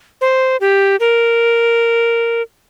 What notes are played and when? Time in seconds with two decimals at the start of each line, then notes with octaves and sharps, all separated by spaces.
0.21 C5
0.61 G4
1.00 A#4